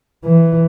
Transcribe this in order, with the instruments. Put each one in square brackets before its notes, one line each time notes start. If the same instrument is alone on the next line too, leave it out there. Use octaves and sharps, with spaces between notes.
[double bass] E3